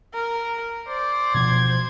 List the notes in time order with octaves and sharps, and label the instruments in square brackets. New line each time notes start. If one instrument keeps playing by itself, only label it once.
[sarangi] A#4
[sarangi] C5 [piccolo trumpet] D5
[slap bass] B2 F3 [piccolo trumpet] G#6